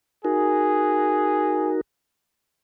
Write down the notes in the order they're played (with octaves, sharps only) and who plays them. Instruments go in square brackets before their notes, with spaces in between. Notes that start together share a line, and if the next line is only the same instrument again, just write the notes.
[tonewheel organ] D#4 F#4 A#4 [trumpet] G#4